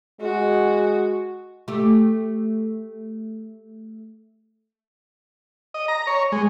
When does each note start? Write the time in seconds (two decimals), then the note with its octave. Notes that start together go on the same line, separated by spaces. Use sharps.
0.21 G#3 F#4
1.68 A3 G4
5.74 D#5
5.88 A#5
6.07 C#5
6.32 G#3